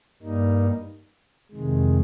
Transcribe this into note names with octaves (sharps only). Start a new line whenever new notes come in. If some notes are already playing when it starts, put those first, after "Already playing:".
G2 G3 A#3 D#4
F2 C3 D#3 G#3